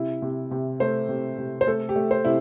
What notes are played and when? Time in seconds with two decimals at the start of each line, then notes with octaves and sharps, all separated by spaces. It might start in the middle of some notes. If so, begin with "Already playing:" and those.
Already playing: C3 E4
0.22 C3
0.51 C3
0.80 A3 C5
1.09 C3
1.38 C3
1.61 C5
1.67 A3 A4
1.89 G4
1.96 A3
2.11 C5
2.25 C3 E4